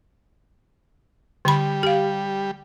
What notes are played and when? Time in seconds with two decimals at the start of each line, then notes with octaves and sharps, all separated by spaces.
1.45 D3 G3 B5
1.83 G4 F5